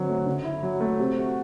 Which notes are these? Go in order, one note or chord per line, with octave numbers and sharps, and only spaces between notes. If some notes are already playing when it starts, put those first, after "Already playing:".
Already playing: D3 F#3 C4
A3
D3
E4
F#3
A3
C3
F#4